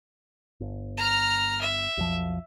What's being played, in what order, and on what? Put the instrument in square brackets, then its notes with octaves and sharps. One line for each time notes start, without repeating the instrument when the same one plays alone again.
[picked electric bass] G1
[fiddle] A#5 F6
E5
[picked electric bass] B1 F2 F3